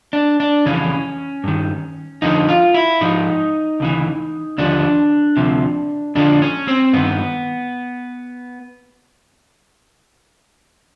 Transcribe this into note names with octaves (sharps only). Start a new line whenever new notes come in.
D4
D4
F2 C#3 E3 C#4
G2 D#3
F2 D3 F3 D#4
F4
E4
G#2 F3 D#4
D2 C#3 E3
D#2 D3 F3 D4
D2 C3 F3
F2 D3 F3 D4
C#4
C4
G2 D#3 B3